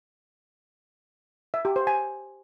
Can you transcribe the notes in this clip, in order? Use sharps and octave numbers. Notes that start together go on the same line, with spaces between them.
E5
G4
C5
G#5